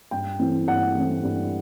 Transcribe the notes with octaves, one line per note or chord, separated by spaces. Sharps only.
G2 G5
E3 A3 C4
G2 F#5
E3 A3 C4
G2